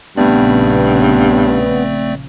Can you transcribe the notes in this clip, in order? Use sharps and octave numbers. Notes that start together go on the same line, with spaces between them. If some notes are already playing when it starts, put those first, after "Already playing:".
A#1 G2 C#3 A3 B3 C4 D5